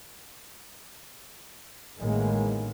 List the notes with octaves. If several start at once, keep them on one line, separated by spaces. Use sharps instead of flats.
A1 A2 D#3 G#3 A#3 B3